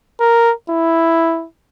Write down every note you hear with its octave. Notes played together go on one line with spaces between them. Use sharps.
A#4
E4